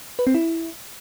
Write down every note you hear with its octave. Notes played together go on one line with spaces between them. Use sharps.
B4
C4
E4